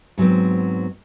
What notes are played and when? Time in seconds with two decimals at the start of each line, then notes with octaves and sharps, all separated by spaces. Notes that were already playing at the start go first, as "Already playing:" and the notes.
0.18 G#2 F#3 B3 C4